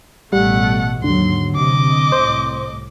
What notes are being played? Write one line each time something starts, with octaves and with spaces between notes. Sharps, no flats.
A1 B2 G3 A3 F#5
D#2 G#2 D3 F#3 C6
C3 D#5 D6
C2 A2 C5